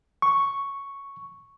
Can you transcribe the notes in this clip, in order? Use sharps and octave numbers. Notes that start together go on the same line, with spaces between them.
C#6